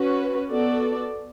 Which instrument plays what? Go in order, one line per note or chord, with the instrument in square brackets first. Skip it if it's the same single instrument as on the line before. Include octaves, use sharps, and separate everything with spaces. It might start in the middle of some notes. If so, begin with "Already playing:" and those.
Already playing: [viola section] C#4 F#4 B4
B3 F#4 A4 D5